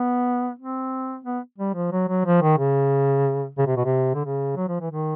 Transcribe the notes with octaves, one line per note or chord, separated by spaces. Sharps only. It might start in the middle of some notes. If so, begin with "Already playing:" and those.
Already playing: B3
C4
B3
G3
F3
F#3
F#3
F3
D#3
C#3
C#3
C3
B2
C3
D3
C#3
F#3
F3
E3
D#3